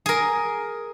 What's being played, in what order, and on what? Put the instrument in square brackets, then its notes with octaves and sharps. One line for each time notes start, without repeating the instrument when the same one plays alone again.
[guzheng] G#4 A#4